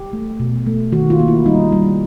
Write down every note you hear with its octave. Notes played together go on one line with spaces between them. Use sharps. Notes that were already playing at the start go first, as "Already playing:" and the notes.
Already playing: G4
A3
B2
A3
D#3 F#4
F4
A#3
E4
G3 D#4
G3